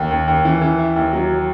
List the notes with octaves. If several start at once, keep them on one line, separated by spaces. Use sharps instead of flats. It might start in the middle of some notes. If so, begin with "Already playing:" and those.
Already playing: D#2
D#2
D#2
E3
E3
E4
D#2
F#3